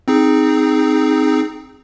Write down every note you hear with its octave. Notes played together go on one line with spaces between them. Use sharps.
C4 D#4 G#4